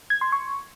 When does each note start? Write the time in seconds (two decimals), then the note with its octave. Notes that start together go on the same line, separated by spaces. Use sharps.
0.10 G#6
0.21 C6
0.32 C#6